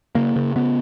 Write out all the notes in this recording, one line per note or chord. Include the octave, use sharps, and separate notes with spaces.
C#3 A#3
C#3
C#3 B3